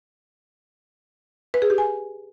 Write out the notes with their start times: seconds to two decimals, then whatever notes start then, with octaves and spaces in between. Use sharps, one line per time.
1.54 B4
1.62 G#4
1.70 G4
1.78 G#5